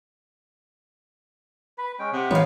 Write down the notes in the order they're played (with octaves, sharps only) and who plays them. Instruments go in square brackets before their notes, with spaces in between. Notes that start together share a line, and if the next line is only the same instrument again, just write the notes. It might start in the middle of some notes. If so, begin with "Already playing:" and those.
[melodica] B4 B5
G#3 C#4 G5
[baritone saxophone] C3 [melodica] D#5 F#5
[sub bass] E3 [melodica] D#4 F4 B4 [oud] C#5 F5